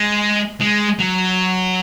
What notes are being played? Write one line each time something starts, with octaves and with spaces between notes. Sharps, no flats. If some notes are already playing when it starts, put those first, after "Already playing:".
Already playing: G#3
G#3
F#3